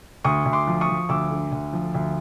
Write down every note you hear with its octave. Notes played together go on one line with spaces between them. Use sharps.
D2 C#6 D#6
D2
C6 D6
F3
C#6 D#6
F3
D2 D6 E6
D3
D2
F3
D2